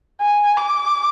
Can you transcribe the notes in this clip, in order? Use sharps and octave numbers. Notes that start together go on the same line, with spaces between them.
G#5
D6